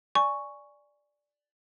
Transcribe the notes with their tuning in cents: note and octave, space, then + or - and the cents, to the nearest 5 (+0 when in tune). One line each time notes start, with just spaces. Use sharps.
D5 +0 G#5 +0 C#6 +0